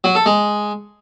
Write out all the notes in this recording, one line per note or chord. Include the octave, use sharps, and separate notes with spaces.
F#3
A4
G#3